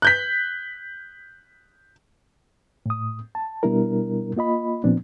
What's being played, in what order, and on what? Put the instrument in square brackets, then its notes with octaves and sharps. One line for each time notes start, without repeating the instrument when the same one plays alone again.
[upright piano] F#6 G6 B6
[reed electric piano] A2 D#6
A5
B2 G3 B3 D4 E4 A#4
A#3 F4 D#5 B5
A#2 F3 B3 C4 D4